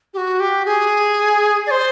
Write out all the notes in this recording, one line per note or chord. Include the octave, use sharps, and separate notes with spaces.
G4
F#4
G4
G#4
D5
C5